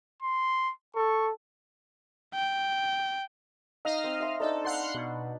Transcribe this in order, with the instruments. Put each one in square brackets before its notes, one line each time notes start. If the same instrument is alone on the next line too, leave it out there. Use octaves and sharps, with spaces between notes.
[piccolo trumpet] C6
[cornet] A4 [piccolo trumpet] C#6
[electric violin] G5
[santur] D#4 [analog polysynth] D#5 F5 F6
[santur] C4
E5 C6
[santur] D4 D#4 C5 [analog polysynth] A4
[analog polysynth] F5 F#5 C6 [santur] B5
[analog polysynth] B2